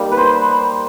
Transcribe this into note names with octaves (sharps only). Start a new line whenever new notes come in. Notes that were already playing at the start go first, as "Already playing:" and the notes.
Already playing: G3 A#3 D#4
B4
C5